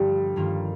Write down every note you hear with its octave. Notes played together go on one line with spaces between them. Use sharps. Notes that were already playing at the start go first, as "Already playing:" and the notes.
Already playing: G1 G2 F3 G3 A3 D#4
G2 D#3 A#3 F4